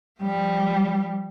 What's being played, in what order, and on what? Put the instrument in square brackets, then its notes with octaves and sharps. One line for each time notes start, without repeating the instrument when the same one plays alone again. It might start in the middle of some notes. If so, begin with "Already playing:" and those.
[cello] F3 G3